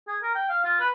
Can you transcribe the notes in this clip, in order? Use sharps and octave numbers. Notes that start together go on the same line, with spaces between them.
G#4
A#4
G5
F5
F4
B4